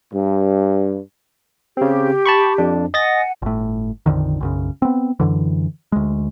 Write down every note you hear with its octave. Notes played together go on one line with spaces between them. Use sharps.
G2
C#3 C4 G4
A5 B5 C#6
F2 D4
D#5 F#5 G#5 A6 A#6
G1 A2
A#1 F2 D3 D#3
B1 F#2 C#3
B3 C4
F#2 D3 E3
D2 G#3